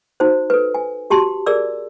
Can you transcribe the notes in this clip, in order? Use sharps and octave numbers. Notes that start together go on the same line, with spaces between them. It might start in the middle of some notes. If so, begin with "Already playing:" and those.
D#4 F#4 C5
A4 B4
G#5
F#4 G4 A5 C6
G#4 A#4 D5 E6